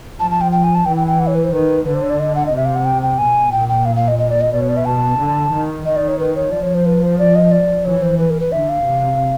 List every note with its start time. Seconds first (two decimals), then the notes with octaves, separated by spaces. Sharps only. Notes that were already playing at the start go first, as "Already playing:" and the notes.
0.19 F3 A5
0.31 A5
0.41 G5
0.52 G5
0.64 G#5
0.75 A5
0.85 E3 G5
0.97 G5
1.07 G5
1.20 F#5
1.27 C#5
1.35 B4
1.44 C5
1.52 D#3 B4
1.85 D3 B4
1.94 C5
2.02 C#5
2.10 D5
2.19 D#5
2.35 F#5
2.46 D#5
2.52 C3 E5
2.65 F5
2.75 F#5
2.85 G5
3.02 G5
3.18 B2 G#5
3.52 A#2 G5
3.69 G5
3.85 F5
3.96 F5
4.08 D#5
4.19 D#5
4.30 D5
4.41 D#5
4.52 B2 D5
4.61 C#5
4.69 D5
4.77 E5
4.85 A5
5.19 D3
5.51 D#3
5.85 D#3 D#5
5.96 D5
6.08 C#5
6.19 B4
6.35 C#5
6.52 F3 D5
6.63 C#5
6.75 C5
6.86 B4
7.02 C5
7.19 D5
7.35 D#5
7.51 D5
7.85 E3 C#5
8.02 C5
8.18 B4
8.30 A#4
8.40 B4
8.52 D3 E5
8.69 F5
8.84 C3